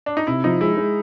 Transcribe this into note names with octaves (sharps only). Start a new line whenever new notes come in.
D4
D#4
C3 E4
F3 D#4
G#3 E4
G#3